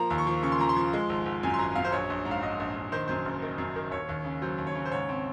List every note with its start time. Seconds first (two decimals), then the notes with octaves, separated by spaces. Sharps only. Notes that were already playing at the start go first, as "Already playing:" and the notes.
Already playing: F3 A#3 A#5
0.10 D#2
0.18 C#6
0.27 F3
0.42 C#3 C#6
0.52 C6
0.59 F3 A#5
0.69 C6
0.76 F3
0.93 G#3
1.09 G#1
1.26 G#1
1.43 F#2 G#5
1.54 C6
1.59 G#1 A#5
1.75 F#2 F5
1.85 C5
1.92 A#1 C#5
2.10 A#1
2.25 G#2
2.31 F5
2.42 G#2 D#5
2.60 A#1
2.76 A#1
2.92 D#3 C5
3.08 F#2 C5
3.25 F#1
3.42 D#3
3.58 F#2
3.76 D#3
3.91 D#2 C#5
4.09 D#2
4.25 C#3
4.42 F#3 C5
4.58 D#2
4.67 C#5
4.75 C#3
4.85 C5
4.92 G#2 C#5
5.09 C4